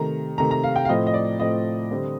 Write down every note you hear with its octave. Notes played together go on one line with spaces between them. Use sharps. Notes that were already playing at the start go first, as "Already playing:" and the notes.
Already playing: C3 D#3 A3 A#5
C3 D#3 A3 A#5
A#5
F5
G5
F5
A2 F3 A3 C4 D#5
D#5
D5
A2 F3 A3 C4 D#5
D3 G3 C4